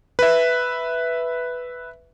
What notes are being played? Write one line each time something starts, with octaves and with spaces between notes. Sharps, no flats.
B4 E5